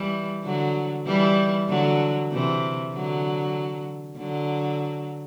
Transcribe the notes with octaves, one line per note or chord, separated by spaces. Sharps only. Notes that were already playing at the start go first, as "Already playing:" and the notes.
Already playing: E3 G3
D3 F#3
E3 G3
D3 F#3
C3 E3
D3 F#3
D3 F#3